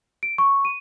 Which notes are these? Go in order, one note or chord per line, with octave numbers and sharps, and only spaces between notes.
D7
C#6
D#7